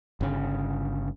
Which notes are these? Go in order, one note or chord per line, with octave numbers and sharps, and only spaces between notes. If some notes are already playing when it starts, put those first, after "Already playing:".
G1 C#3